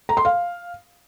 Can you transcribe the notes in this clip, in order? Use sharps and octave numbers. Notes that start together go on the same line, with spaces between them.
A#5
C6
F5